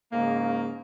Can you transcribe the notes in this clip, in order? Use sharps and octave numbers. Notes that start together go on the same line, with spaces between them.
G#2 C#3 A#3